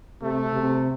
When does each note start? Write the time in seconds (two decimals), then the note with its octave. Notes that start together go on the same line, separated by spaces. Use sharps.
0.23 C3 A3
0.53 C3